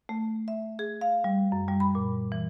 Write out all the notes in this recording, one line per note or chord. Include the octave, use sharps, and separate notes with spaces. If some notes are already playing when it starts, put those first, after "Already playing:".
A3
E5
G#4
F5
G3
F#2
G3
B5
A#2
E3